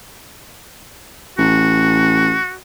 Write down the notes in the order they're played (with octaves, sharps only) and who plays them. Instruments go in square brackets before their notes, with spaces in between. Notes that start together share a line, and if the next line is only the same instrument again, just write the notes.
[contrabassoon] A1 [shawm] F#4